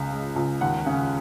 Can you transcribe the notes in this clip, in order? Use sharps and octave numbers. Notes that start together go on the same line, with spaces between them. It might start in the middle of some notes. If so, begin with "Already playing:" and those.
Already playing: C#2 C#3
G#3
C#2
D#2 F#5
C#3